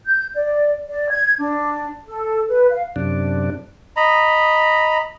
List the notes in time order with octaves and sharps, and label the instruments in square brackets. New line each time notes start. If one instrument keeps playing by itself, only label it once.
[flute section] G6
D5
D5
G#6
D4
A4
B4
F5
[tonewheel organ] F#2 C3 D4
[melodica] D#5 A#5 B5